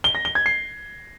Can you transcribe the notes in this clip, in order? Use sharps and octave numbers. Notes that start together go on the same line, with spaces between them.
G7
A#6
G7
G#6
C7